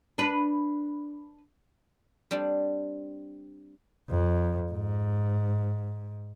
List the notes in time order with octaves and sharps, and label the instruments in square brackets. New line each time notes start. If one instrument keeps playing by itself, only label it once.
[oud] D4 B4
[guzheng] G3 C4 D4
[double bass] F2
G#2